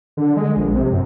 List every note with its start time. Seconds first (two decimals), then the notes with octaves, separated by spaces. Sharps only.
0.17 D3
0.36 G#3
0.57 A#1
0.75 C3
0.92 F#2